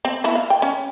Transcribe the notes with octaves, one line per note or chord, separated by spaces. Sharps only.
C4
B3 E4 E5
F5
G5
C#4